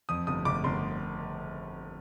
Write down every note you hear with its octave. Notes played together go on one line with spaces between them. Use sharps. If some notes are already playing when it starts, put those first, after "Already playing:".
F2 D#6
G1 D#6
G1 D6
G1 C6